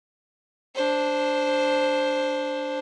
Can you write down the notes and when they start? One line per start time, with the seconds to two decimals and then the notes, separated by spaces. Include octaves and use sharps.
0.76 D4 C5